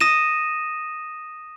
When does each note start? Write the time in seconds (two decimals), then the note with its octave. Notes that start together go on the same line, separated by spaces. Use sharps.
0.01 D#6 A#6 D#7 E7